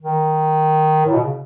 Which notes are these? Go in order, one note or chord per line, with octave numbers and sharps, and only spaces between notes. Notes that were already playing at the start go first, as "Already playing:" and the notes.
D#3
A2
B2
C#3